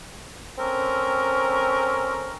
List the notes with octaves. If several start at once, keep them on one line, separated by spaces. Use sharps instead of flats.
C4 C#4 A4 A#4